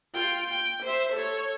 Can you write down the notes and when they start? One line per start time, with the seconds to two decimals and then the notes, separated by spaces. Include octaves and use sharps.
0.14 F4 G5
0.51 G5
0.82 C5 E5
1.12 A4 C#5